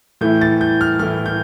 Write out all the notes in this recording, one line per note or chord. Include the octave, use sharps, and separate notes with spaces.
A2 E3 A3 E4 G6
A6
G6
F6
A2 E3 A3 E4 F6
G6